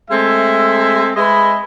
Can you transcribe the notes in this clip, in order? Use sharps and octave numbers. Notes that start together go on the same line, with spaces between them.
G#3 A3 C4 A4 E5
G#3 B4 D#5 E5 B5